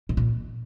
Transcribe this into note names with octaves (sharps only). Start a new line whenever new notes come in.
A2
A#2